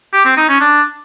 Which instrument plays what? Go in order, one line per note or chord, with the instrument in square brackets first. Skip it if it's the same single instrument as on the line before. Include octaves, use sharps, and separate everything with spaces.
[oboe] G4
C4
D#4
C#4
D4